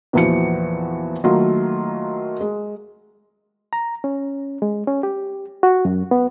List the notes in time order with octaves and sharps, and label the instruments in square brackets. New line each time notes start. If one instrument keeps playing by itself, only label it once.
[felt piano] E2 A#2 E3 F3 F#4 C#7
D#3 F#3 A3 A#3 F4
G#3
[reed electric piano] A#5
C#4
G#3
C#4
G4
F#4
F#2
B3